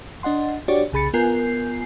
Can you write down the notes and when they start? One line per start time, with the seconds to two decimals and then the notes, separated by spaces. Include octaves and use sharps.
0.23 D4 D#5 F#5 C6
0.68 D4 F#4 G4 C#5 D5
0.92 C2 C#3 G#4 B5 A6 C#7
1.14 B3 F4 A#4 G#5 G6 C7